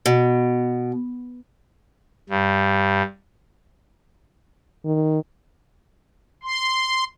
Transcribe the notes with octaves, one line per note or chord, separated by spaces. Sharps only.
B2
G2
D#3
C6